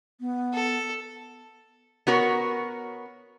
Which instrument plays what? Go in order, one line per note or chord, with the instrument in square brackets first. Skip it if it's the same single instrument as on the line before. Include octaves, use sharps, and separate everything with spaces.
[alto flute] B3
[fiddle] A4
[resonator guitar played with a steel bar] B3 F#4 A#4 C#5